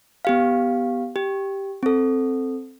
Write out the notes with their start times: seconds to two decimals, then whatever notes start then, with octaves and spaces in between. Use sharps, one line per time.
0.25 B3 G4 F5
1.16 G4
1.83 C4 A4